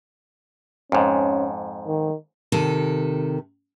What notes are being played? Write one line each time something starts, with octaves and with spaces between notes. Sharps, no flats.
F2 G#2 C#4
D#3
C3 D#3 A4